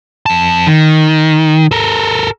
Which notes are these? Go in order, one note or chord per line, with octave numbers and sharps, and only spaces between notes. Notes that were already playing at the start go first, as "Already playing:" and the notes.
F2 A5
D#3
A4 A#4